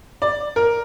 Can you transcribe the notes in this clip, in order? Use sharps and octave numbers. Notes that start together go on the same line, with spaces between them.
D5
A#4